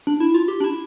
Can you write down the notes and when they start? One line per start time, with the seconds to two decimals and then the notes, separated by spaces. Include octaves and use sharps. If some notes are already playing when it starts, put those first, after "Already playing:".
0.07 D4
0.20 E4
0.34 F4
0.48 G4
0.60 D4
0.64 E4